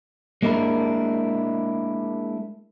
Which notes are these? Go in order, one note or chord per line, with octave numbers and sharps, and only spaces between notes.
G#3 A#3 D4 E4 A#4